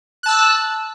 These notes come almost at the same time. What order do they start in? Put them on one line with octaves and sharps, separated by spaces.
F#6 A5 E6